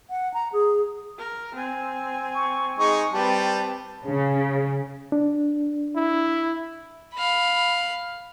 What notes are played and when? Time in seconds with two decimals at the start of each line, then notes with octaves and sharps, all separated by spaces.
0.10 F#5
0.34 A#5
0.53 G#4
1.18 A#4
1.55 C4 G#5
2.35 C#6
2.79 G#3 D#4 G#4 C#6
3.13 G3 C4 G4 B4 A5
4.04 C#3
5.12 D4
5.96 E4
7.14 F5 B5